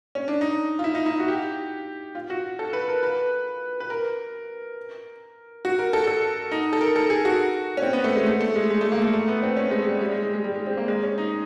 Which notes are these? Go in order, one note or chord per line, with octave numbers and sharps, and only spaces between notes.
C#4
D4
D#4
F4
E4
D#4
E4
F#4
G4
F4
F#4
A4
B4
A#4
B4
B4
A#4
F#4
A#4
A4
A4
D#4
A4
A#4
A4
G#4
F#4
C#4
C4
B3
A3
G#3
A3
A3
G#3
G#3
A3
A#3
A3
A3
B3
C4
C#4
G#3
G3
G3
G#3
G#3
G#3
G3
G#3
C4
A#3
G#3
C#4
D#4